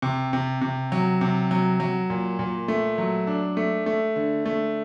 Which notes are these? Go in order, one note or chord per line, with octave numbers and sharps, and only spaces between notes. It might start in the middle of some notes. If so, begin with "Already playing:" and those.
C3
C3
C3
F#3
C3
F#3
F#3
A#2
A#2
A3
F#3
D4
A3
A3
D3
A3